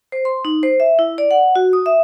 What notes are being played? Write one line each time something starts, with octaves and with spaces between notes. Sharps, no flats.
C5
C6
D#4
C5
E5
E4
D5
F#5
F#4
D#6
E5